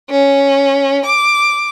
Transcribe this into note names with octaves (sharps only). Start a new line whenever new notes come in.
C#4
D6